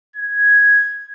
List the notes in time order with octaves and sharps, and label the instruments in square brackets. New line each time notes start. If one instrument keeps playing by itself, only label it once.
[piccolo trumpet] G#6